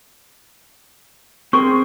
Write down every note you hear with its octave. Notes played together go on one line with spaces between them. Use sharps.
C4 G#4 A#4 C#6